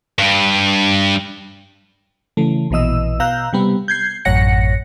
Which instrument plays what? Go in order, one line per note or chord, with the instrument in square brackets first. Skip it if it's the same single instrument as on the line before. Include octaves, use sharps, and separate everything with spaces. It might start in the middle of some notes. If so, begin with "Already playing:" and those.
[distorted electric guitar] G2
[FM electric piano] C#3 E3 A3
A#1 B2 E3 D#5 E6
B2 F5 A#5 E6 F#6 G6
C3 G3 B3
G6 G#6 C7
A1 F#2 C#5 F#5 A#6 C#7